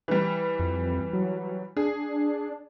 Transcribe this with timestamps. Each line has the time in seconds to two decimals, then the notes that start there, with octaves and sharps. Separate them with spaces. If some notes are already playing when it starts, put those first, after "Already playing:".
0.08 E3 G3
0.59 F2
1.13 F#3
1.77 D4 G#4